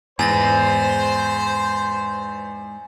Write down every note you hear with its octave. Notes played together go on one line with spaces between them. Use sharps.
E2 G#2 C5 G#5 A6 A#6